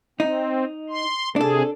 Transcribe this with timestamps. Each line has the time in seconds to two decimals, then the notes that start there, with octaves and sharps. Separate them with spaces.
0.20 C4 D#4
0.89 C6
1.36 C3 D4 G#4 A4